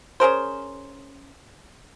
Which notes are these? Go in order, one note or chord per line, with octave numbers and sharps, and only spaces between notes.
C#4 G#4 A#4 C5